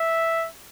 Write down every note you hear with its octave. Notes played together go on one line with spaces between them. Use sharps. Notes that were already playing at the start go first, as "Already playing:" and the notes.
Already playing: E5